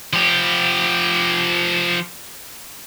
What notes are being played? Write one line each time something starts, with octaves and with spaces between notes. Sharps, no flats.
F3 G4